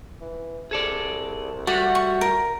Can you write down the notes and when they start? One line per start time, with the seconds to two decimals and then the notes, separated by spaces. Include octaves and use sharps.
0.21 E3
0.71 C2 G#4 A4 D5
1.67 G3 A3 F#4 D5 F#5
1.95 C#6
2.21 A#4